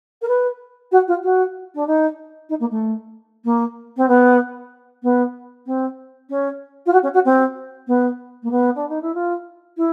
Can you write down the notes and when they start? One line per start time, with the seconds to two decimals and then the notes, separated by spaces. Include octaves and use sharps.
0.22 A#4
0.28 B4
0.91 F#4
1.07 F4
1.23 F#4
1.74 D4
1.87 D#4
2.49 D#4
2.60 A#3
2.70 A3
3.44 A#3
3.97 C4
4.08 B3
5.03 B3
5.66 C4
6.29 C#4
6.86 F4
6.93 F#4
7.03 C#4
7.14 F#4
7.25 C4
7.87 B3
8.43 A#3
8.51 B3
8.75 D4
8.89 D#4
9.01 E4
9.14 F4
9.77 E4